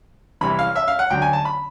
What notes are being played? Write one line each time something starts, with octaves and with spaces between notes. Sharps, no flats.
C2 C3 E3 B5
F5
E5
F5
F#5
D2 D3 F#3 G5
G#5
A5
B5